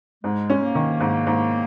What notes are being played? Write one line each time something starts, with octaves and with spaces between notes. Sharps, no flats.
G#2 G#3
C#4
A#3
D#3
G#2
G#2